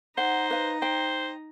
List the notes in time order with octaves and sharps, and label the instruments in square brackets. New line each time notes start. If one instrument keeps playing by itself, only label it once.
[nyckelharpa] D#4 A#5 [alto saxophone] C5 [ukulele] F#5
[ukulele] B4 F5
[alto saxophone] C5 [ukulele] G5